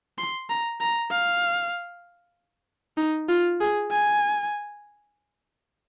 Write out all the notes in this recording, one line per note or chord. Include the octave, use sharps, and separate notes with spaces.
C6
A#5
A#5
F5
D#4
F4
G#4
G#5